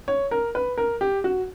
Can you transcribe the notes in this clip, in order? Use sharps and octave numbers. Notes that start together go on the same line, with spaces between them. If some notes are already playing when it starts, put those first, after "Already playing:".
C#5
A#4
B4
A#4
G4
F#4